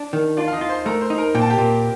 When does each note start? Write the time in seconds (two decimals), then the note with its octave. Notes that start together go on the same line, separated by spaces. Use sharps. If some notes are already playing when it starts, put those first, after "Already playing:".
Already playing: D4
0.13 D#3
0.37 D4 F4 D5
0.48 F5
0.53 D#4 D#5
0.61 F4
0.69 C5 C6
0.85 A3 A#4 A#5
1.01 C5 C6
1.10 D#4
1.18 A#4 A#5
1.35 A#2 G5
1.42 A5
1.50 G4 G5
1.58 A#2